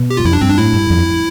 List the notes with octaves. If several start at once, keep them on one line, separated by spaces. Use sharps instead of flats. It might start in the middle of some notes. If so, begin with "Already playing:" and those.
Already playing: B2
G4
G2 F4
F2 E4
D4
G2 C4
D4
A2 E4
G2
F2